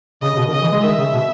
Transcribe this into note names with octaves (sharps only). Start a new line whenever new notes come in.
C#3 D#5
C#3
B2
D#3
C#3 D#5
E3
G#3
D#3 E5
C#3
B2